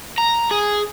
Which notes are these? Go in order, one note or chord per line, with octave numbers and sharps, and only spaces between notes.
A#5
G#4